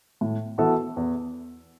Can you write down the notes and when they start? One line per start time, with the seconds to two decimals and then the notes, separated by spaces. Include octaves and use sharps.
0.21 A2
0.58 E3 B3 F#4 A4
0.97 E2